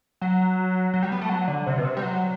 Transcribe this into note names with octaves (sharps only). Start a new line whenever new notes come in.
F#3
F#3
G3
B3
A3
F#3
D3
C3
B2
C3
G3
F#3